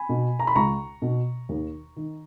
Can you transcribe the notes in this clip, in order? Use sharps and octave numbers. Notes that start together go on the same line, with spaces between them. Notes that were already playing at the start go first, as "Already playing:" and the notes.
Already playing: G#5 B5
B2
A#5
B5
C#2 A#5 C#6
B2
D#2
D#3